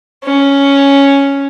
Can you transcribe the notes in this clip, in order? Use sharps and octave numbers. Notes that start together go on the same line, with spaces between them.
C#4